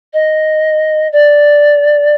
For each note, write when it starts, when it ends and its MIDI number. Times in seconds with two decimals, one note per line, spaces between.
0.13 1.07 75
1.12 2.15 74